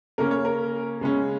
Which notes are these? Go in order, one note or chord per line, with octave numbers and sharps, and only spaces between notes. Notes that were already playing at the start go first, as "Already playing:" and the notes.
C#3 A#3 C#4 A#4
C#5
A#4
C#3 G#3 C#4